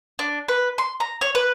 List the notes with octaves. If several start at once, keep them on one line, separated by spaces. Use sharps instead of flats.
D4
B4
C6
A#5
C#5
B4